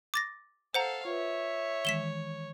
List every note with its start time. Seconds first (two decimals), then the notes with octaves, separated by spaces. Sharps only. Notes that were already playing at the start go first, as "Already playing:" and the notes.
0.14 D6 A6 A#6
0.74 A4 C5 F5 F#5 A#5
1.05 F4 B4 C#5 E5
1.85 D#3 E3 G#3 B6 E7 G7